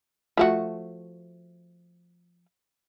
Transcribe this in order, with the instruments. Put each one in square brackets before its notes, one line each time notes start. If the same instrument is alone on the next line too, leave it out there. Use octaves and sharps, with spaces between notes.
[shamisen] F3 A3 F#4